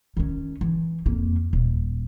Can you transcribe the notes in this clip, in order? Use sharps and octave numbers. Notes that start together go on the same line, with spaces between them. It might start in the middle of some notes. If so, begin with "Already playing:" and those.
D#3 C#4
E3
F2 A#3
D#1